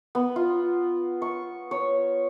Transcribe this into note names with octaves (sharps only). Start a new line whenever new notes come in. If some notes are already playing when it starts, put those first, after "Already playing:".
B3
F4
C#6
C#5